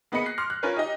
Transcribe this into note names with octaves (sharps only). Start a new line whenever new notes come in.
A#3 B3 G#4 D#5 B5 C#7
F#6 A#6 C7
C6 D6 F6
F#6
C#4 F4 A#4 B4 C#5 G#5
D#4 G4 D#5